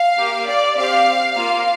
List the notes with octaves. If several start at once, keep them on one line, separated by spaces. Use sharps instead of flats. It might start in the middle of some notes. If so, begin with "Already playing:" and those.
Already playing: F5
A#3 G4
D5
C4 G4 F5
A#3 F4 F5